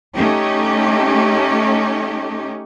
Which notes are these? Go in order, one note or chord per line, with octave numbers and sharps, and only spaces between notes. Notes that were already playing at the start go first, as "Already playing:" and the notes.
A3 C#4 D#4 G4